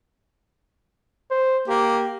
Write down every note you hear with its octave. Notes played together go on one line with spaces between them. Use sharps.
C5
A#3 G4